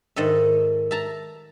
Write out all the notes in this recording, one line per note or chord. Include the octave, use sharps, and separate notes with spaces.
G#2 D#3 A4 D#5 E5
E5 A5 A#5